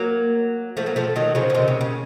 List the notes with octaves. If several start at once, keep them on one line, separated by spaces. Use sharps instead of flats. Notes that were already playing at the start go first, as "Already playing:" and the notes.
Already playing: F#3 A#3
F3 A3
F#3 A#3
F3 A3
D#3 F#3
C#3 F3
C#3
C3 D#3
C#3
C#3